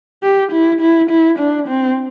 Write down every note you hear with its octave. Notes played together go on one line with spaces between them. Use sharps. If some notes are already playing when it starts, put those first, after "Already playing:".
G4
E4
E4
E4
D4
C4